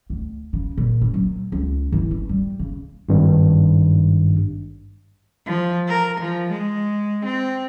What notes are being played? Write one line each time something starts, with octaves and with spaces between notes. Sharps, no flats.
D2
C#3
A#2
C#4
F#3
C#2
E3
C#4
G3
C#3
G#1 G2
F3
A#4
F3
G#3
C4